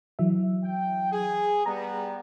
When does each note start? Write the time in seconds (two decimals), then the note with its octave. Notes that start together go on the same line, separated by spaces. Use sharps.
0.19 E3 F#3 E5
0.64 G5
1.11 G#4
1.66 G3 B3 A#5